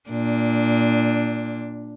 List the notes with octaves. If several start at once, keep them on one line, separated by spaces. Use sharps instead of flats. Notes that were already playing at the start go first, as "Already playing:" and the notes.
A#2 D4